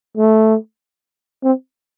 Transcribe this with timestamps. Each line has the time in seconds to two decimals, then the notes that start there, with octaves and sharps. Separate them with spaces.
0.17 A3
1.43 C4